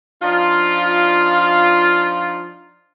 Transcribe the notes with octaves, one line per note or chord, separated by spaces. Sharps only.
F3 D4 D#4 F4